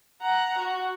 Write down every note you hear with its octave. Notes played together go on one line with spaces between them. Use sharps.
F#5 A#5
F#4